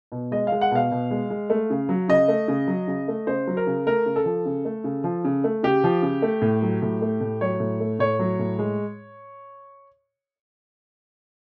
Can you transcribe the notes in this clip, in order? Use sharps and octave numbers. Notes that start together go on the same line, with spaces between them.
B2
G#3 D#5
G#3 F5
F#5
B2 F5
B2
G#3
G#3
A3
C#3
F#3
C#3 D#5
A3
C#3
F#3
C#3
A3
C#3 C5
F#3
A#4
C#3
A3 A#4
C#3
A4
F3
C#3
A3
C#3
F3
C#3
A3
C#3 G4
F3
C#3
A3
A2
F#3
A2
A3
A2
F#3 C#5
A2
A3
A2 C#5
F#3
A2
G#3